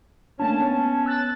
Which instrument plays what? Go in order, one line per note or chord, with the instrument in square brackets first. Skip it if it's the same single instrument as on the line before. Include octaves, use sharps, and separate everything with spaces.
[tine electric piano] A3 A#3 D4 [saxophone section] C#4 [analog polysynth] A5
[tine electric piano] B3 C#5
[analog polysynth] E6 F#6 A6